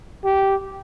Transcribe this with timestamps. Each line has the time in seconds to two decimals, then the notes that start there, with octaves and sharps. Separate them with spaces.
0.25 G4